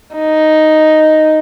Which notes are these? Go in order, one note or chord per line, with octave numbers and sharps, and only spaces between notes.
D#4